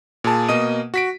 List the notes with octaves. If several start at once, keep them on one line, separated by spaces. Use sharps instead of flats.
A#2 G#4 A5
B2 A#3 D#5 D#6 D#7
F#4 B6 D7